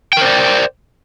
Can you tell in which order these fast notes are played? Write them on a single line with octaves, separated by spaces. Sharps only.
G5 A#4 C5 D5